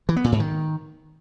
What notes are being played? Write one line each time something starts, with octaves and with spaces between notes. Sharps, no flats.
E3
B3
A#2
G#2
D#3